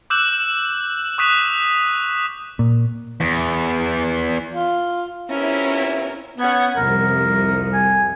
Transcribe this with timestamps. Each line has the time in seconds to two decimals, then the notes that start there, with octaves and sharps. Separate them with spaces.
0.10 D6 E6 F#6 G6 E7 F#7
1.18 C#6 D#6 F#6 B6 D#7 E7
2.59 A#2
3.20 E2
4.53 F4
5.30 C3 B3 C#4 E4 F4 A#4
6.38 B3 C#4 F#5 G#6
6.76 C2 F2 A#4
7.74 G#5